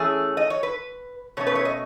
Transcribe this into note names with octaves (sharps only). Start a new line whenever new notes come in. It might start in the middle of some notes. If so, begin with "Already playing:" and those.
Already playing: E3 A3 C#4 G#4
D#5
C#5
B4
B2 A3 C#4 C#5
B4
C#5
D#5